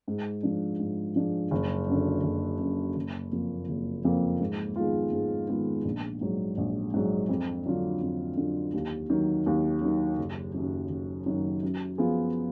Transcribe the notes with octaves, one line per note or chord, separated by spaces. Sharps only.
G#2
F3 G#3 D4
G#2
F3 G#3 D4
F#1
F#2 D3
F#1
F#2 D3
F#1
F2 F3 A#3
F#1
F2 F3 A#3
G#2
D#3 G#3 B3 F4
G#2
D#3 G#3 B3 F4
A#1
G#2 F#3
A#1
G#2 F#3
F2
D3 F#3 D4 F4
F2
D3 F#3 D4 F4
D#2
D#3 F#3
D#2
D#3 F#3
F#1
F#2 D#3 F#3
F#1
F#2 D#3 F#3
F#2
F3 B3 F4 G#4